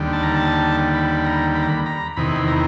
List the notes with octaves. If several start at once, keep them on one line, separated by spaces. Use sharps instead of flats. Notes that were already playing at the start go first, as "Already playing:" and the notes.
Already playing: D#2 D3 G3
A5
A#5
A5
B5
A#5
B5
A#5
B5
A#5
E2 C3 D#3 B5
A#5